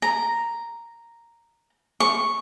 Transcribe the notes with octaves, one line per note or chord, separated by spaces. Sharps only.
A#5
C#6